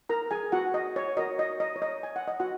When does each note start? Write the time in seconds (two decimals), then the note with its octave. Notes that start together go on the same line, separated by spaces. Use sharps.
0.09 A#4 A#5
0.31 G#4 G#5
0.52 F#4 F#5
0.74 D#5
0.96 C#5
1.17 F#4 A#4 C#5 D#5
1.39 D#5
1.60 D#5
1.76 C#5
1.82 D#5
2.03 G#5
2.16 F#5
2.28 D#5
2.40 F#4 F#5